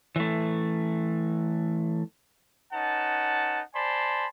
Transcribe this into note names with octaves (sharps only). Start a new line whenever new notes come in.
E3 A3
C#4 D#4 B4 F#5 A5
C5 D5 G#5 A5 B5 C6